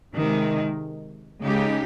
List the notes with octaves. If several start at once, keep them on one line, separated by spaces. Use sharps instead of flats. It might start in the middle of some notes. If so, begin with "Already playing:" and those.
C3 D#3 G#3
C#3 G#3 D#4 G4